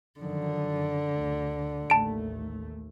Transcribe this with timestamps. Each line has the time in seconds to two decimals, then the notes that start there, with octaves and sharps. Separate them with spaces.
0.20 F#2 D3 D#3 F3
1.13 D2
1.90 A1 D#2 A3 A5 D7